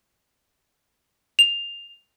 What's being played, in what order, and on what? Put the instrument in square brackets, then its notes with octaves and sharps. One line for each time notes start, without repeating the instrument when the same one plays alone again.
[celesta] F7